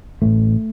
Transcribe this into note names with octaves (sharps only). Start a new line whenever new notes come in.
A1 A2 A3